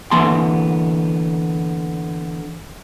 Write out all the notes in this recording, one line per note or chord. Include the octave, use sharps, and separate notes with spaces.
D3 E3 A#3 B3 A5 C6